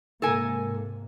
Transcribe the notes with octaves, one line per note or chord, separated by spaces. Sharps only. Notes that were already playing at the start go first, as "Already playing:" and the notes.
G#2 C3 A#3 A4 A#4 G#5